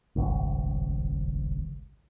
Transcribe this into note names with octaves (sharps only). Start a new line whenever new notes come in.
D#1 G#1 C#2